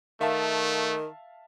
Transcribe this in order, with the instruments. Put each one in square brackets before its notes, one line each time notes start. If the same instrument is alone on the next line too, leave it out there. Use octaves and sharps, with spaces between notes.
[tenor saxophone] D#3 [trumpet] A3 [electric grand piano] E5 F5 A5